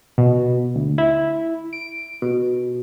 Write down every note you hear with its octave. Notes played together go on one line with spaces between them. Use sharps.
B2
D2
E4
D7
B2